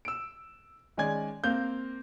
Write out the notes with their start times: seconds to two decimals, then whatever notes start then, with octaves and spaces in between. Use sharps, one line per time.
0.05 E6 D7
0.97 D#3 G#3 C#4 D5 G#5 G#6
1.44 A#3 C4 F5 G6